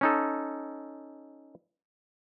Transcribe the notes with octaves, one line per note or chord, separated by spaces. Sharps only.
C#4 D#4 A4